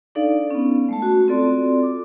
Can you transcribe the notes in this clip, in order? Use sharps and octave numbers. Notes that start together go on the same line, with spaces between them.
D4 D#4 A4 D5 F5
B3 C#4
G#3 A3 A5
F#4
C4 F4 A4 D5 C6
D6